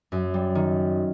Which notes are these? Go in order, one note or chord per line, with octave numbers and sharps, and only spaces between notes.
F#2
G3
D#3